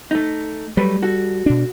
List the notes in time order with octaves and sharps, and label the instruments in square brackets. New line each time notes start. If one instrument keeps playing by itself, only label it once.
[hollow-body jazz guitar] A3 D#4
[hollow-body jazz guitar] F#3 A3 B4 [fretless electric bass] G3
[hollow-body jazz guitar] F#4 A4
[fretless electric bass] B2 D4